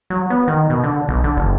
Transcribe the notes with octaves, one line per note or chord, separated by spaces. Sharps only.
F#3
B3
D#3
B2
D3
B1
D3
F#1